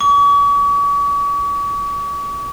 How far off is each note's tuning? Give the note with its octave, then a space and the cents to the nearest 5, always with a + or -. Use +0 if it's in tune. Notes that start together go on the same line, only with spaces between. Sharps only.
C#6 +45